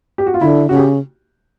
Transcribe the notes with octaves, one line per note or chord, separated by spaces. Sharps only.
G4
F#4
F4
D3 E4
C#3 F#4
G4